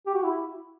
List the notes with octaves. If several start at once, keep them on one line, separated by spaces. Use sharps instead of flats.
G4
F#4
E4